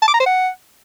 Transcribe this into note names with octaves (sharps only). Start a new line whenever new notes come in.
A5
D6
A#5
C5
F#5